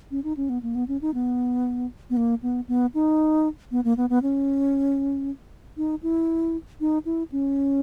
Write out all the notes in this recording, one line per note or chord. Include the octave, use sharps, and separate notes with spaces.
C#4
D#4
C#4
B3
A#3
B3
C#4
D#4
B3
B3
A#3
B3
B3
D#4
B3
A#3
B3
B3
C#4
D#4
E4
D#4
E4
C#4